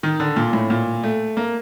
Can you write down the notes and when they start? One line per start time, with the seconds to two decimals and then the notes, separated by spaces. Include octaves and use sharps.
0.03 D#3
0.20 D3
0.36 A#2
0.53 A2
0.70 A#2
1.04 A3
1.37 A#3